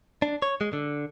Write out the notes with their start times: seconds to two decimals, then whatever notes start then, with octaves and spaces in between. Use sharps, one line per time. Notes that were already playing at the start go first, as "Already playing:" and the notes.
0.22 D4
0.42 C#5
0.61 G#3
0.73 D3